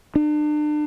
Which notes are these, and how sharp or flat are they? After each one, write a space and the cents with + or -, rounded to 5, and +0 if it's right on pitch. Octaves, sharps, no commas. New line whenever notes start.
D4 +40